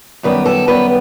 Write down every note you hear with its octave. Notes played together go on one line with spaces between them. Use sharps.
F#2 D#3 G3 B3 B4
A4
F#2 D#3 G3 B3 B4